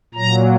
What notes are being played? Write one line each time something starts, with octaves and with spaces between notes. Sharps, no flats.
A#2 F#3 A#5